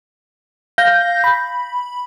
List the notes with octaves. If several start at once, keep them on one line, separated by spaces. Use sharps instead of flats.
F5 G6 A#6
B5